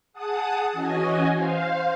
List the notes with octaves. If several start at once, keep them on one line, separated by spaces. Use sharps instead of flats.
G#4 F#5 A5 D#6
E3 C#4 F#4 D#5 G#5
C5 F5